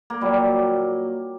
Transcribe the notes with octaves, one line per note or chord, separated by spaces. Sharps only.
A#3
A#2 F#3 G3